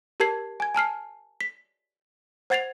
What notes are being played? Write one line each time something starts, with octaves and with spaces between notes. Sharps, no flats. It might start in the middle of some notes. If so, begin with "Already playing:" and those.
G4 A#4 A5 G#6 C7
G#5 G#6
G#5 A5 F6 C7
B6
C5 F#5 G#6 A6 C7 F7